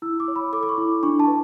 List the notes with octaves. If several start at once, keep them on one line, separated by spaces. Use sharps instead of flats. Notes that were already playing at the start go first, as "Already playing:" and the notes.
E4 E6
D6
C#5
B5
A4 D6
D6
C#6
E4
D4 C#6
A5
B4